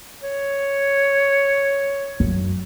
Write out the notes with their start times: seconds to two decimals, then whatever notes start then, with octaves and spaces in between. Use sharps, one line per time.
0.23 C#5
2.20 F#2